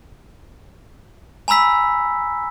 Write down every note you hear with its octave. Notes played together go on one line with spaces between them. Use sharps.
G#5 A#5 B5 E6 B6